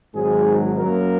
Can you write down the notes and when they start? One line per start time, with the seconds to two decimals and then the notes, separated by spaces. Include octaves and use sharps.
0.13 G#1 G#2 F#3 G#4
0.80 F#2 F#3 A#3 A#4